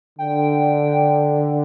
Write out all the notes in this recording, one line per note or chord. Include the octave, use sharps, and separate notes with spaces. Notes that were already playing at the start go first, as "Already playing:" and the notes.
D3 G5